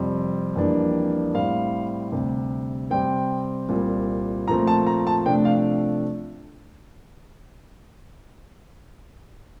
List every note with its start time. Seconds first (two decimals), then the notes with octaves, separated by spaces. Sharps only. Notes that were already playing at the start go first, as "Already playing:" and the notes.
Already playing: F2 C3 G3 C4
0.56 F2 E3 G3 A#3 D4
1.34 A2 G3 C4 F5
2.12 D2 C3 G3
2.90 C3 G3 C4 G5
3.69 C2 A#2 G3 C4
4.48 A#2 F3 A3 C4 A#5
4.67 A5
4.87 A#5
5.07 A5
5.26 C3 F3 A3 D4 G5
5.45 F5